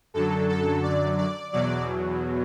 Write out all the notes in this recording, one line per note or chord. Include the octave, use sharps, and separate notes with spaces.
F#2 D3 F#3 A4
A4
D5
D5
E2 B2 F#3 D5